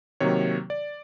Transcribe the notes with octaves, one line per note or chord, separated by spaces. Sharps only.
C3 D#3 F#3 A#3 C#5
D5